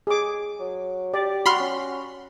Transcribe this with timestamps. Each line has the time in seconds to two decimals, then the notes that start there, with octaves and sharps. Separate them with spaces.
0.07 G#4 D6
0.60 F#3
1.14 G4 D5
1.46 F#4 B5 C6 F6
1.60 C#4